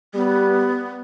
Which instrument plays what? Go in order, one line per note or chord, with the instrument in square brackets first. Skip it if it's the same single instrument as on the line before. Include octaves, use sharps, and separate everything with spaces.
[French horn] G3 [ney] B3